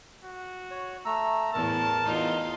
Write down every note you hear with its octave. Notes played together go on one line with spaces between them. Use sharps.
F#4
C#5
A3 A#5 E6
E2 A2 A#4 A5
E2 D#4 F4